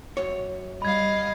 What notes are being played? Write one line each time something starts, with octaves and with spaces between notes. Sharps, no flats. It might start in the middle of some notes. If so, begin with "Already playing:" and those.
F#2 C#5
G3 D#5 F5 B5 G#6